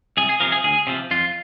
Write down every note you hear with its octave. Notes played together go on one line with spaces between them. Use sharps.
C2 G#4
G#4
C3 F3 A#4
G#4
D2 G#4
C3 F3
F2 F4